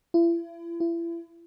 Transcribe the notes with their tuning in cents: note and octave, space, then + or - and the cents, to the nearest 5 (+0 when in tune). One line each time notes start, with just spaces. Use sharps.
E4 +40
E4 +35